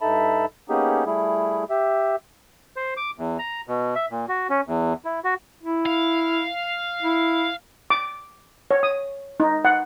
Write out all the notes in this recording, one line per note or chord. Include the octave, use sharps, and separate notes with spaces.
G2 D#4 A4 E5 A5 B5
A#3 B3 C#4 D#4 G4 G#4
G3 A3 E4 G#4
G4 E5
C5
D6
E2
A#5
B2
E5
A#2
F#4
C#4
E2
E4
F#4
E4
F5
E4
D6
C#5
D#6
D#4
F#5